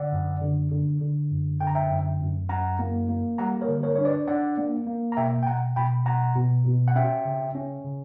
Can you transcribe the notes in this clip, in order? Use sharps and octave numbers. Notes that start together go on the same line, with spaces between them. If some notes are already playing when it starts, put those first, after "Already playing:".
Already playing: D3 D5 F#5
F#2
D3
D3
D3
F#2
D3 G5
A#5
E5 G5
F#2
F#2
F#2 F#5 A#5
A#3
A#3
G3 F#5 A#5
A#4 C#5
D3
A#4 C#5
D4 C#5
B4 D5
D4 D5 F#5
A#3
A#3
A#5
B2 E5 G5
G5
B2 F#5 A#5
B2 G5 B5
B2 F#5 A#5
B2
B2
F#5
C#4 E5 G5
C#3
C#4
C#3